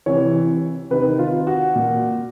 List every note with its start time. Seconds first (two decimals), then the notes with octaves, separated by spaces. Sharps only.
0.06 C3 E3 C#5
0.91 C3 D#3 B4
1.19 F4
1.47 F#4
1.76 A#2